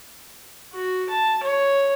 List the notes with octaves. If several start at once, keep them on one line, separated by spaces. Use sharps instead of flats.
F#4
A5
C#5